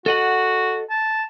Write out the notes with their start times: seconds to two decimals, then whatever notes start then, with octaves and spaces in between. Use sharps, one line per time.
0.06 F#4 A4 D#5 F#5
0.90 A5